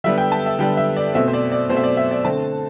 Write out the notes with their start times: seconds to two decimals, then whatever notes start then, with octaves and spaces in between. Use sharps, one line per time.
0.04 D3 G3 B3 E5
0.18 G5
0.32 A5
0.46 E5
0.59 D3 G3 B3 G5
0.77 E5
0.96 D5
1.14 B2 A3 C4 E5
1.28 C5
1.33 D5
1.52 D5
1.69 B2 A3 C4 C5
1.77 E5
1.84 D5
1.97 E5
2.11 D5
2.24 D3 A3 C4 A5